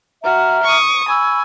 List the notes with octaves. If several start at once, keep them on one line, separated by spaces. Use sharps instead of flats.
F#4 E5 A#5 F6
C#6 D#6
G#5 B5 C#6 E6